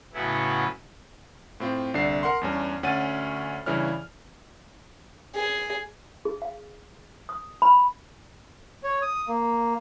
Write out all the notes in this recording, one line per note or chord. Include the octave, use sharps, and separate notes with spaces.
A2 C#3 F#3 B3 C#4 E4
A2 C4 F4
C2 D3 D4 C7
A#4 F#5 C6
E2 G2 C#4
D2 C#4 F#5 A6 D#7
G2 C#3 E3 E4 C#5 F6
G#4
G#4
F5
D#6
B5
C#5
D#6
A#3